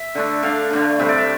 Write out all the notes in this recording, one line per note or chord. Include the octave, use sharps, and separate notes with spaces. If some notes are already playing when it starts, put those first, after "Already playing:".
Already playing: E5
D3 A3 D4
D3 A3 D4 F5
D3 A3 D4
C3 G3 C4 E5
D5
E5